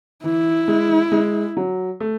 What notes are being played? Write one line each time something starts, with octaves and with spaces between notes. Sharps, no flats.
E3 E4
G#3
G#3
F#3
A3